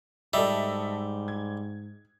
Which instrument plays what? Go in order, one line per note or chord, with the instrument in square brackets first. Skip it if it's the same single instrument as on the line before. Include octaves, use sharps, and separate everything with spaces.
[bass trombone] G#2 [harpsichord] G3 [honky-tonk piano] A4 D#5 E5
[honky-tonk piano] G#6